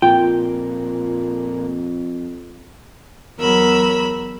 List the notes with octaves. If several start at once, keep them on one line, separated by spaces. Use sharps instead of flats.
F2 A#2 F4 G5
E2 F#3 A#4 B5 E6